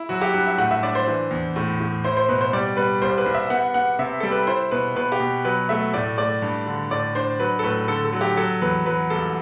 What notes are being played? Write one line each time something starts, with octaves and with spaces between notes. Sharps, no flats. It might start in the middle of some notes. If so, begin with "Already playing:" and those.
Already playing: E4
F#3 F#4
G4
G2 F#4
E5
A2 F#5
E5
D4 D5
C5
E3
E2
A2
A2
E4 C5
C5
B2 B4
C5
G3 D5
G3 B4
C2 C5
B4
C2
E5
B3 F#5
B3 F#5
C3 E5
G3 A4
B4
E4 C5
B2 B4
B2 B4
G4
B2
F#3 B4
A3 E5
A2 D5
A3 D5
G2
D3
A2 D5
D4 C5
F#3 B4
A4
A2 B4
D3 A4
A4
F#3
G4
F#3 A4
E2 B4
F#3 B4
C2 A4